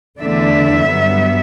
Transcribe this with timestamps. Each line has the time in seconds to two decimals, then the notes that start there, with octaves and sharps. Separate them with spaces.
0.21 E2 D3 A3 D4 E5
0.86 G2 F#3 B3